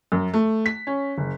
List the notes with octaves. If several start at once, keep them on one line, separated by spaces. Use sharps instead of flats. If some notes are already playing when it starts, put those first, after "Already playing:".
F#2
A3
B6
C#4
F#1